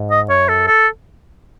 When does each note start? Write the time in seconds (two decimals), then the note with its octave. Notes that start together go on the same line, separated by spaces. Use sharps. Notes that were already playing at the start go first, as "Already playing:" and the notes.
Already playing: G#2
0.11 D#5
0.29 F#2 C#5
0.49 A4
0.68 A4